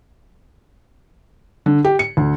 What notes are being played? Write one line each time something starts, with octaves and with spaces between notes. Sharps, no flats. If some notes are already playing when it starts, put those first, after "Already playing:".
D3
G4
C#7
D2